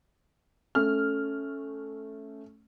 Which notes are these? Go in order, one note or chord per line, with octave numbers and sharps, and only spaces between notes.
A3 C#4 F6